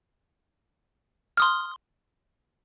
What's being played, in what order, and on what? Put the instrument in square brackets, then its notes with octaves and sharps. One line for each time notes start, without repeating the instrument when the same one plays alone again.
[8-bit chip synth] C6 D#6 F6